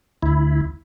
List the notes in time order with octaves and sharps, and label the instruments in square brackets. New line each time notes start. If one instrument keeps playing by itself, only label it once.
[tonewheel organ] D2 E4